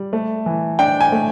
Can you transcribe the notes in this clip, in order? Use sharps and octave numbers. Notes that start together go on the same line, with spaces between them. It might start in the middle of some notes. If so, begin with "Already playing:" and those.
Already playing: G3
A3
E3
D4 G5
G#5
A3